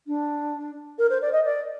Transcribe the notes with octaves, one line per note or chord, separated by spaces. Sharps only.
D4
A#4
C5
D5
D#5
D5